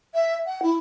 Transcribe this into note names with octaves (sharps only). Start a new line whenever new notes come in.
E5
F#5
E4